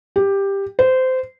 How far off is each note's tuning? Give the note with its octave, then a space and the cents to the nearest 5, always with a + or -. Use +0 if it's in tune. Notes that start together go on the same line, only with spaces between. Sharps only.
G4 +10
C5 -20